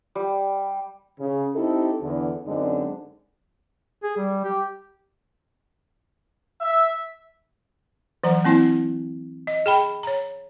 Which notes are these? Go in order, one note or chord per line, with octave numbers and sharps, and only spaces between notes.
G3
C#3
C4 D#4 E4 G4 A4
E2 D3
F#2 D3 G#3 C4 D4 D#4
G#4
G3
G4
E5
E3 F#3 F#5 A#5
A#3 C4 E4 G#5
D#5
G#4 G5 B5
C#5 A#5